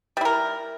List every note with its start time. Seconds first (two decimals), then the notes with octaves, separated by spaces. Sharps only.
0.17 G3
0.21 E4
0.25 A#4